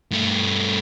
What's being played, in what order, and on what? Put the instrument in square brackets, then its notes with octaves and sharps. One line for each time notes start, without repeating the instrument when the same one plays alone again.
[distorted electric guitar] G2 A3